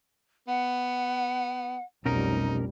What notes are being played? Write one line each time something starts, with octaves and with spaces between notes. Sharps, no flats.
B3 F#5
F1 B1 B2 G3 C#4 D#4 A#4